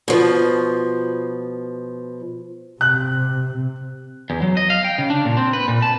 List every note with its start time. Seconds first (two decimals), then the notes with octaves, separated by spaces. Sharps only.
0.08 B2 F3
2.81 C3 F#6
4.30 E2
4.42 F#3
4.57 D#5
4.70 F5
4.84 G5
4.98 C#3
5.10 D4
5.25 A#2
5.37 C4
5.53 B4
5.68 A#2
5.82 A5